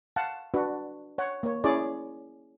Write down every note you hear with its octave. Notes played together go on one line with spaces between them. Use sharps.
F5 F#5 A5
D4 F#4 B4
C#5 F#5
A#3 C#5
C#4 E4 G#4 C#5 D5